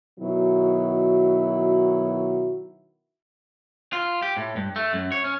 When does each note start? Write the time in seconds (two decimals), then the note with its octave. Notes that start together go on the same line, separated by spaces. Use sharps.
0.20 B2 D#3 F#3 E4 F#4
3.93 F4
4.22 G4
4.37 A2
4.56 G2
4.76 A3
4.93 F#2
5.12 C#5
5.24 C#4